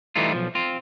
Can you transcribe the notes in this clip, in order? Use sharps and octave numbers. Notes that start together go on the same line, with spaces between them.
E3 G3 A3 D#4 F4
B1 F3
C4 F4